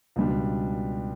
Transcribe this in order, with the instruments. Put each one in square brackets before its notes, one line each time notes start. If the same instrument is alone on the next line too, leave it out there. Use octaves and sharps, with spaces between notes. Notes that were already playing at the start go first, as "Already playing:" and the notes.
[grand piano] C#2 B2 G3 D4